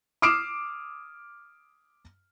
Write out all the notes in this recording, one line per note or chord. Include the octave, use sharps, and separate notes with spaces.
D6 D#6 F6 C7 D7 E7